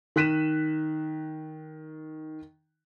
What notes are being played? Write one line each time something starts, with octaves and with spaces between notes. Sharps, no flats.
D#3 F#6 B6 D#7 E7